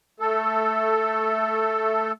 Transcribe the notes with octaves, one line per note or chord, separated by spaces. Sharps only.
A3 A4